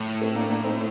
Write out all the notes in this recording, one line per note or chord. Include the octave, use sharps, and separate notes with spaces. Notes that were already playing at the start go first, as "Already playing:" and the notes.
Already playing: A2
A3 C4
A#3 D4
A#3 D4
C4 D#4